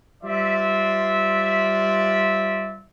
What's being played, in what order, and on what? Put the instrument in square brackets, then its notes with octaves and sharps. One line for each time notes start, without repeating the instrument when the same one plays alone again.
[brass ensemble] G3 F4 C5 D5 E5